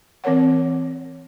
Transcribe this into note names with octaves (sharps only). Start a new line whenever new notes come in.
E3 C4 A#4 C#5 F#5